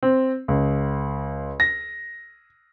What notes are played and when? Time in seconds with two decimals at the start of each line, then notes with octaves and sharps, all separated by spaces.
0.03 C4
0.48 C#2
1.60 A#6